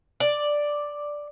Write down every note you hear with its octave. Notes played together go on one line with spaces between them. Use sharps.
D5